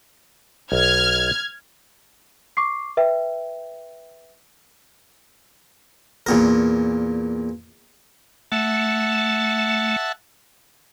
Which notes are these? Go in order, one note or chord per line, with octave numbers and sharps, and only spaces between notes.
B1 F6 G#6
C#6 D6 C7
B4 E5 G5
E2 A#2 A#4
A3 E5 F#5 A5